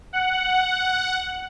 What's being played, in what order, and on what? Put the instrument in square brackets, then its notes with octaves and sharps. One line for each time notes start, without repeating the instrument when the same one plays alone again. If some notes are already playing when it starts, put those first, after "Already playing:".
[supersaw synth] F#5